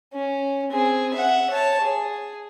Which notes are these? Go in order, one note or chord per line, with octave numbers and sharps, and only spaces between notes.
C#4
C4 G#4
E5 F#5
C#5 A5
G#4